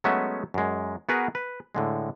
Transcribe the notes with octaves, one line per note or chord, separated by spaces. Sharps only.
F#3 G#3 A3 B3 C#4 E5
F#2 G#3
B3 F#4 G#4 A#4 B4
B4
A2 D3 G#3